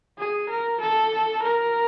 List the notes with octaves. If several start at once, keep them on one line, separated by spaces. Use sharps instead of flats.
G#4
A#4
A4
A#4